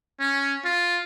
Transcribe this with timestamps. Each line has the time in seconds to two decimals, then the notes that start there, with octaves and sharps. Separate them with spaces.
0.20 C#4
0.65 F4